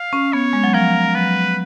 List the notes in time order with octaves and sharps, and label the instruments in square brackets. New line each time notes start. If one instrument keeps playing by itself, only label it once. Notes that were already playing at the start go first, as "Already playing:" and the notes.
Already playing: [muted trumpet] F5
[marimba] C#4
[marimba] B3 [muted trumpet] C#5
[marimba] G#3
F#3
[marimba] F3 [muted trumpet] A#4
[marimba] F#3 [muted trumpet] B4